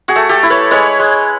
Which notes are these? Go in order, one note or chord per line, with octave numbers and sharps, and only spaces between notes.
F#4 G#4
A3
G4 A4
E4
B4 C#5
G#3 B4 C#5
G#3